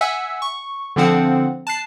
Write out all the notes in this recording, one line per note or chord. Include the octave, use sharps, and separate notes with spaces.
E5 F#5 G#5 E6
C#6
D3 F3 C4 F#5
A5 F#6 C7